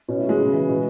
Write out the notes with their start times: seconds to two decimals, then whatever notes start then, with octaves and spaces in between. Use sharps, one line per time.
0.08 B2 C#4
0.19 A3
0.24 F#3
0.29 G#3
0.38 C#3
0.53 E3
0.69 B2